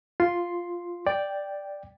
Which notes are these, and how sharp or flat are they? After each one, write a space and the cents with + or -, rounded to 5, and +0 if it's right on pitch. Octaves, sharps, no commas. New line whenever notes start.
F4 +0 C6 +0
D5 +0 G5 +0